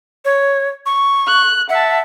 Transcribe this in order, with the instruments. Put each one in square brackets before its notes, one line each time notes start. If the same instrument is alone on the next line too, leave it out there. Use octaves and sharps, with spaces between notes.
[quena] C#5
C#6
[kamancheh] F#6
[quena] E5 [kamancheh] F#5 A5